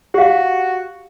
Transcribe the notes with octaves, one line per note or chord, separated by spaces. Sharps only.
F#4 G4 F5